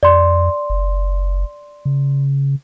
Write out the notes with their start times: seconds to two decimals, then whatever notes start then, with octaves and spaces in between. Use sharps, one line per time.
0.03 F2 D5 C6
0.70 F#1
1.85 C#3